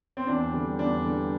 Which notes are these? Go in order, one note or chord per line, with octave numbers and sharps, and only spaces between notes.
C4
E2 D4
D3 G3
E2 D4
D3 G3